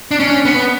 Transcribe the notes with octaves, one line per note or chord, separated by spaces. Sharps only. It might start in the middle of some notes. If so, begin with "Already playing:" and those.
D4
C#4
B3